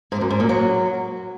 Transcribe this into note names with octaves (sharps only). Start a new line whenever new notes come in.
G#2
F#2
G#2
A#2
F#3